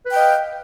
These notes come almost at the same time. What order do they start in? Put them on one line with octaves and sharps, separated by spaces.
B4 G5 D#5 F5